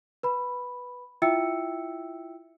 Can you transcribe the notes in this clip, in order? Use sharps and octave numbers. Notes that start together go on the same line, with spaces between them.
B4 B5
E4 F4 E5 G5 E6 C#7